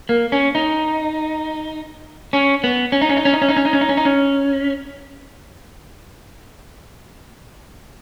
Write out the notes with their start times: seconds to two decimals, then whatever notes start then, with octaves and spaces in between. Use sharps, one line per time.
0.09 A#3
0.32 C#4
0.55 D#4
2.33 C#4
2.64 B3
2.92 C#4
3.01 D#4
3.09 C#4
3.17 D#4
3.25 C#4
3.33 D#4
3.42 C#4
3.49 D#4
3.56 C#4
3.65 D#4
3.73 C#4
3.81 D#4
3.89 C#4
3.97 D#4
4.05 C#4